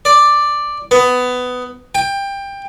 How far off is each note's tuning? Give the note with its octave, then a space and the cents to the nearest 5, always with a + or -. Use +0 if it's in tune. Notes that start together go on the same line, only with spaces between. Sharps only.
D5 +5
B3 +15
G5 +20